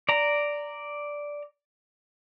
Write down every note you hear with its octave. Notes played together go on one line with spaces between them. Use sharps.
D5 A#5